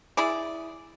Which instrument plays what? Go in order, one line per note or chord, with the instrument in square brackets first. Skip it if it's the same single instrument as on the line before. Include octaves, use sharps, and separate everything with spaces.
[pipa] E4 G#4 D5